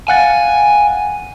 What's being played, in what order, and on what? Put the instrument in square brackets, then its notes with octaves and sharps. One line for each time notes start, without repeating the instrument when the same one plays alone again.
[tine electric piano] F5 F#5 A6 [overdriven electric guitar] G#5